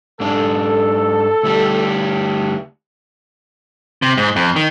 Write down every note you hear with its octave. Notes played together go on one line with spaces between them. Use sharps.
G#2 D4 A4
D2 G3
C3
G#2
F2
D#3